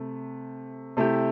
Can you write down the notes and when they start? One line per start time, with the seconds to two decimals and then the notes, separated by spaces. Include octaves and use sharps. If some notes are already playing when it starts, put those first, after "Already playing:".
Already playing: C3 A3
0.97 C3 A3 E4 G4